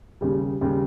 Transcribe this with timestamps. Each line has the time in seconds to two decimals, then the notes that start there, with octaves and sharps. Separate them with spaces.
0.21 D#2 C#3 G3
0.61 D#2 C#3 G3